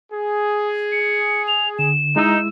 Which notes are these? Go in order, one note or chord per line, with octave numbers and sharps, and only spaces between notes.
G#4
C#7
F7
D3 E7
G#3 D#4 E4 E6